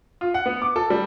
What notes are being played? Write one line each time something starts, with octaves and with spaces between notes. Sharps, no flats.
F4
F#5
B3
D6
A4
G3